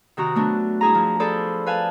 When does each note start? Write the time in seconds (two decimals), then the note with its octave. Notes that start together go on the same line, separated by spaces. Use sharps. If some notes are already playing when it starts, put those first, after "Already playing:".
0.17 C3 D#3 F#4 A#5
0.35 F#3 A3 B3 D4
0.81 G2 E4 G#4 A#5
0.95 F3
1.20 G#4 A4 C5 D5 B5
1.66 B4 F5 G#5 A5